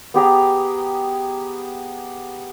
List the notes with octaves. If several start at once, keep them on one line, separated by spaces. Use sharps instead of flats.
B3 G4 G#4 A#5